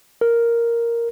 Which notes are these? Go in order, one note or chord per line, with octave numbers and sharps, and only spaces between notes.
A#4